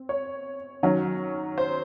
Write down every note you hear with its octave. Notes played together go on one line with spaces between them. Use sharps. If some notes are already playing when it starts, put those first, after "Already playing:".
Already playing: C4
C#5
D#3 F#3 C#4
C5